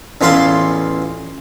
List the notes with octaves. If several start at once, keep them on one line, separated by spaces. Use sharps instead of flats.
A1 E2 F4 F5 B5 C6